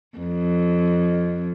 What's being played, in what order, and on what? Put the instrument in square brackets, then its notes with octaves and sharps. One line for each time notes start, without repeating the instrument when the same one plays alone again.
[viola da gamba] F2